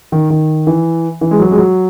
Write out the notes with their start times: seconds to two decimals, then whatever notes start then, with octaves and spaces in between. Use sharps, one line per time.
0.12 D#3
0.30 D#3
0.67 E3
1.21 E3
1.31 G#3
1.40 F#3
1.51 G#3
1.58 F#3